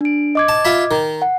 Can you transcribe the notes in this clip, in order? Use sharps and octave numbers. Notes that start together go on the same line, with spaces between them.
D4 D7
D#5 D6 G#6
A5
F4 E5 B5
D#3
F#5